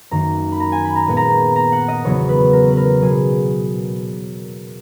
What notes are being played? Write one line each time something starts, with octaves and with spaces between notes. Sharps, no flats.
F#2 D#3 A#3 A#5
B5
A#5
G#5
B5
A#5
A#2 G#3 B3 G#5
A#5
A#5
F#5
D#5
E2 C#3 F#3 B3 C#5
B4
A#4
B4
A#4
B2 F#3 B3 G#4